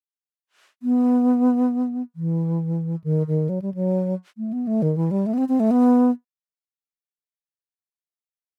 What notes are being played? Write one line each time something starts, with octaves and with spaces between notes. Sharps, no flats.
B3
E3
D#3
D#3
F#3
G3
F#3
A3
B3
A3
D#3
E3
G3
A3
B3
C4
C4
A3
B3